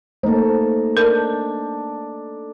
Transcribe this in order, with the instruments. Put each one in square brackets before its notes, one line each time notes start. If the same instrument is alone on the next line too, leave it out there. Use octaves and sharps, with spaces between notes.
[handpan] A3 A#3 [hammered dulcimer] D#4 A4 [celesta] C5
[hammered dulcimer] D4 [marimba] A#4